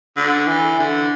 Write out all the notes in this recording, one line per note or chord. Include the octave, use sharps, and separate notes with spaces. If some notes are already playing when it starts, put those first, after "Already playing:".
D3
E3
D3